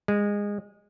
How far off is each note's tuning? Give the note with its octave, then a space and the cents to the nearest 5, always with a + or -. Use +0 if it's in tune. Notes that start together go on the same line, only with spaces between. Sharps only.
G#3 -20